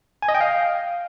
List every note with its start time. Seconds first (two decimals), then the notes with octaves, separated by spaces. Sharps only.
0.22 G#5
0.29 D#5
0.35 G5
0.41 F5